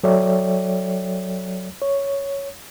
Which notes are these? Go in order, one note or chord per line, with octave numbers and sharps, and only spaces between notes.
F#3 A4 C#5 D5 E5 G5
C#5